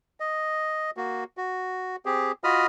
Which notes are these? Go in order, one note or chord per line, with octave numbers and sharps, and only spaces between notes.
D#5
A#3 F#4
F#4
C4 G4 G#4
F4 F#4 D#5 B5 D#6 F6